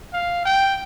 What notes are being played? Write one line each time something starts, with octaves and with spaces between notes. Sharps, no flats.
F5
G5